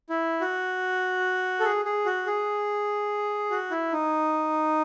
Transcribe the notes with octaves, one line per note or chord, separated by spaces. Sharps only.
E4
F#4
A4
G#4
G#4
F#4
G#4
F#4
E4
D#4